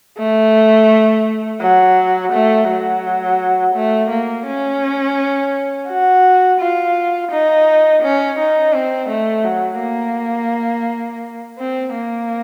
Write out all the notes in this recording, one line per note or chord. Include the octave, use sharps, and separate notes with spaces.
A3
F#3
A3
F#3
A3
A#3
C#4
F#4
F4
D#4
C#4
D#4
C4
A3
F#3
A#3
C4
A#3